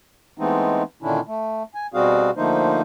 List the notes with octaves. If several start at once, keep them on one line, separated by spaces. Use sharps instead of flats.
E3 G#3 A3 B3 C4 D#4
A#2 D3 D#3 C#4 D4 E4
A3
G#5
B2 G3 C4 F#4 G#4 F5
D3 F3 A3 A#3 D#4 C5